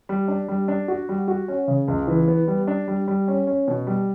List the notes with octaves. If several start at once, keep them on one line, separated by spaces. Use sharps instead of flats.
G3
D4
G3
D4
F#4
G3
F#4
C#4
C#3
C#2
E3
B3
G3
D4
G3
G3
C#4
C#4
B2
G3